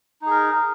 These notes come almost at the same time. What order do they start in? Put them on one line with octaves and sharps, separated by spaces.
D#4 G#4 A#4